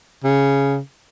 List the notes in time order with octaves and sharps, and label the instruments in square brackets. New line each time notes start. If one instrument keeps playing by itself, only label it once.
[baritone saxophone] C#3